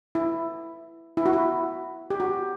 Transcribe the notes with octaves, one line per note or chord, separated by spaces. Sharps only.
E4
E4
F#4
E4
G4
F#4